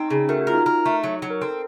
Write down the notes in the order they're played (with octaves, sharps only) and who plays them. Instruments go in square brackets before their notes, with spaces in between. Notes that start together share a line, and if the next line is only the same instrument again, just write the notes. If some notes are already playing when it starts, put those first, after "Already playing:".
Already playing: [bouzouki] C4 [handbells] D#4
[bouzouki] C#3
[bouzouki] A3 [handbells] F#4 A#4
[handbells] F#4
[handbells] F4 [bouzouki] A#4
[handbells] D#4
[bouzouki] A#4
A3
F#3
F#3
[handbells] A#4
[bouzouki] C4 [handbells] A4 C5